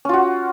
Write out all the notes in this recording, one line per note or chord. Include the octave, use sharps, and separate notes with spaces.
C#4 F4 F#4